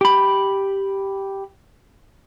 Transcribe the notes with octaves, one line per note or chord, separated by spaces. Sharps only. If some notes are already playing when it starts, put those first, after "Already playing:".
G4 B5